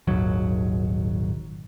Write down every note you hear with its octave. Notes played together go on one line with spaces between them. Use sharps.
D#1 G#1 D#2 F#3